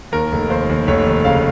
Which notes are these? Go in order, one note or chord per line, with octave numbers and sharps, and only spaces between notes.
D#2 A#4
F1
D#2 C5
D#2
F1 C#5
D#2
C#3 F5